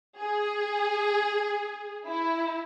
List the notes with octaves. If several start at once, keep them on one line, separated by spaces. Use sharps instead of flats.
G#4
E4